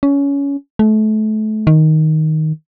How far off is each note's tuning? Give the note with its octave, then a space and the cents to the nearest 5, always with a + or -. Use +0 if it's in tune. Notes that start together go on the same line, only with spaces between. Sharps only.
C#4 +20
A3 -30
D#3 +5